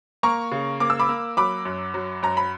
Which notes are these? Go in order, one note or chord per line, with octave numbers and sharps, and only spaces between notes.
A#3 A#5 C#6
C#3
A#3 D6
E6
B5 D6
A#3
F#3 B5 D6
F#2
F#3
F#2 A#5
B5